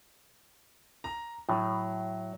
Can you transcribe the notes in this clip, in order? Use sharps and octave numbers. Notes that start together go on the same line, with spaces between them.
A#5
A2 F#3